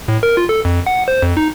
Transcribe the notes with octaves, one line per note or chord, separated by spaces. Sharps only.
A2
A#4
F4
A4
F2
F#5
C5
F2
D#4